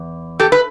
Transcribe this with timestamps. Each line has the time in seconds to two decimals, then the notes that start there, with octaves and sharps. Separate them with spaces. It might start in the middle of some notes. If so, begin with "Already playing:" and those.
Already playing: E2
0.40 G4 A4
0.52 B4